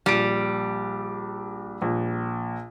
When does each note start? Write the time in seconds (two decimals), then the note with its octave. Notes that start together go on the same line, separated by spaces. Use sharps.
0.06 A#1 G3 D7
1.82 A#1